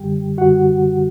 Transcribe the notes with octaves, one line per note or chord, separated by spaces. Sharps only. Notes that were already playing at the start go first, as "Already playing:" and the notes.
Already playing: F#2 D3 G3 G4 G5
F#2 D3 G3 F#4 F#5